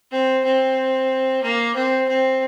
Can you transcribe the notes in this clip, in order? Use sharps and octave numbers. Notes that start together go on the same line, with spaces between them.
C4
C4
A#3
C4
C4